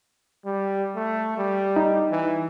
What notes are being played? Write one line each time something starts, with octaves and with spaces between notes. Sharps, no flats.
G3
A3
G3
D#4
E3